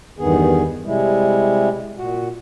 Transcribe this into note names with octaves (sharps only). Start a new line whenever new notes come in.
E2 G2 D#3 B3 G#4
C3 G3 G#3 E4
A#2 F#4